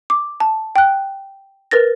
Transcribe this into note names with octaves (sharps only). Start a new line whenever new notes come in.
D6
A5
G5 F#6
A#4 B4 A6 A#6